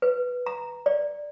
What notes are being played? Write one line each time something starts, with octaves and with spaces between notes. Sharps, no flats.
B4
A#5
D5